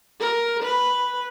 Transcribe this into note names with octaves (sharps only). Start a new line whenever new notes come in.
A#4
B4